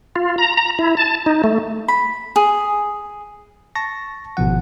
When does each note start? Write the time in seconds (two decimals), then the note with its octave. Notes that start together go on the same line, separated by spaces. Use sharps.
0.16 F4
0.38 A#5
0.57 A#5
0.79 E4
0.97 A5
1.26 D#4
1.44 A3
1.88 B5
2.36 G#4
3.75 A5 C#6 A#6
4.37 G#1 B2 F3 F#5